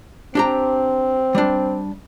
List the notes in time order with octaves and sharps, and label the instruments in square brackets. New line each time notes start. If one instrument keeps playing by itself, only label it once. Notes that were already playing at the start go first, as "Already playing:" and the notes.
[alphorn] C4 [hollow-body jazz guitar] D4 G4 A#5
[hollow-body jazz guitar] G3 D4